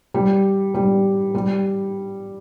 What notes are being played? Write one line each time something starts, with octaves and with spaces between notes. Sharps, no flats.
G3
G3
G3